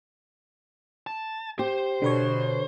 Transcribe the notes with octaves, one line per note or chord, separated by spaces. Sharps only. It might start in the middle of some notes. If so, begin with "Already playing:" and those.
A5
G4 C5
B2 D3 B4 C#5